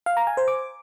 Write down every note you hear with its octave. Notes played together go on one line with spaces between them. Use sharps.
F5
A#5
G#5
C5
D6